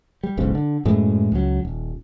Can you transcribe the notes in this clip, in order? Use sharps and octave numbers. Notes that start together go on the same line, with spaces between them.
G3
E1 B1 G#2 C#3
D3
F#2 A2 E3 G#3
C#2 F#3
D#1